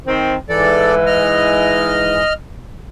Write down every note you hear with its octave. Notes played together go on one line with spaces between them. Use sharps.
D#3 C4
G#2 E3 A4 D5
D#5 F6